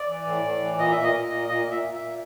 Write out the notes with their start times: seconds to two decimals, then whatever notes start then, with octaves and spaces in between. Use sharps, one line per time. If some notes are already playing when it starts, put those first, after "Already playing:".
Already playing: D5
0.08 E3
0.26 A2
0.44 A2
0.62 E3
0.78 A#2 D#5
0.91 E5
0.96 A#2
1.04 D#5
1.13 A#2
1.31 A#2
1.48 A#2 D#5
1.65 A#2
1.71 E5
1.82 A#2
1.94 E5
2.00 A#2